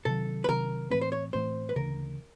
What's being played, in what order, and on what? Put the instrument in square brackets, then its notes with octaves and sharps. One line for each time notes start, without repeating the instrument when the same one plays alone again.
[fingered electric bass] C3 D#3 F#3 [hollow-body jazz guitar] A4
[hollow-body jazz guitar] B4
[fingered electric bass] C3 D#3 F#3 [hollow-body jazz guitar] A#4
[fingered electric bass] A2 E3 A3 C4 [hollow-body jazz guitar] B4
[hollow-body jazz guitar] C5
C#5
[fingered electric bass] A2 E3 A3 C4 [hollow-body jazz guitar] C5
[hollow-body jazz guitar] B4
[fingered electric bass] D2 C#3 E3 [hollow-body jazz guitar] A#4